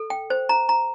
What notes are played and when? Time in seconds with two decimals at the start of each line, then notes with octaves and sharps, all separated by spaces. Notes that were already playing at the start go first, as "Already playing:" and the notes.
Already playing: A4
0.10 G5
0.30 C5
0.49 A#5
0.69 A#5